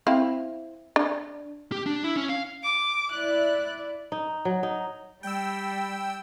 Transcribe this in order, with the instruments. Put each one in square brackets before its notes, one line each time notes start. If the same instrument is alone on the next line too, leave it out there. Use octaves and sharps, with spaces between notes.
[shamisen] C4 E4 F5
D4
[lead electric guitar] G4
D4
E4
C#4
F5
[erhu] D6
[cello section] E4 D5 [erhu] F#6
[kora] D#4
F#3
D#4
[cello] G3 [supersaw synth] G5 E6